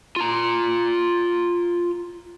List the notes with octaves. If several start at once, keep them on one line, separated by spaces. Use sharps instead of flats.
F4 A#5